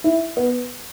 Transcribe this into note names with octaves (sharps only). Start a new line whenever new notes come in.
E4
B3